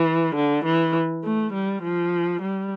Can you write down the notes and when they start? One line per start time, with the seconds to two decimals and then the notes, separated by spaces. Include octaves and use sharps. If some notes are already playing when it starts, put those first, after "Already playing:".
Already playing: E3
0.35 D3
0.65 E3
1.24 A3
1.53 G3
1.83 F3
2.42 G3